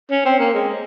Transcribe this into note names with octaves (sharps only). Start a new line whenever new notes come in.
C#4
C4
A#3
G#3